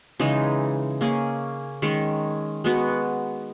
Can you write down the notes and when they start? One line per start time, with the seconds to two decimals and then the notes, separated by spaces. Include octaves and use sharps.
0.20 C#3 E3 G#3 D#4
1.01 A#3 C#4 G#4
1.82 D#3 G#3 C#4
2.64 G#3 B3 F#4